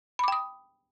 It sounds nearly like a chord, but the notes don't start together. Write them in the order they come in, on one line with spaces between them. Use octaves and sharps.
B5 D6 G5 D#6